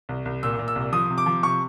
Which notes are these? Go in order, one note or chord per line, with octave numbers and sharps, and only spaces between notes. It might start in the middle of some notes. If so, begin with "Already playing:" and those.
C2
C2
A#2 E6
A#2
E6
C2
F3 D#6
C3
D6
F3
C3 C#6